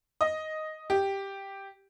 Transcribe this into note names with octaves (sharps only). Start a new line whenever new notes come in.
D#5
G4